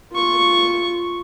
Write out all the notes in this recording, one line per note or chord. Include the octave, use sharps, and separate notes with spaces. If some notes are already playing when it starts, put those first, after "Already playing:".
F4 C#6